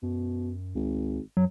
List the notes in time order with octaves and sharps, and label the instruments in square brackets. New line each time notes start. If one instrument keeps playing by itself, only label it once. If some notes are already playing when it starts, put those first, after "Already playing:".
[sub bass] F#2 [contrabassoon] B2
[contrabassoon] G#1 [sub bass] C#2
[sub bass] F#2 [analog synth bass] F#3